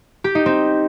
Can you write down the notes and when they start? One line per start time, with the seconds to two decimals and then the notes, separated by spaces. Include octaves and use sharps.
0.24 G4
0.35 D#4
0.46 C4